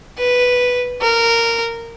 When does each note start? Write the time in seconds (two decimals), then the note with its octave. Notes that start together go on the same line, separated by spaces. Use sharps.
0.18 B4
1.02 A#4